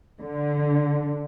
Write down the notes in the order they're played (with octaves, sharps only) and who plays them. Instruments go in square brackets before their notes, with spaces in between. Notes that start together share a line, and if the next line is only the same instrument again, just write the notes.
[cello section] D3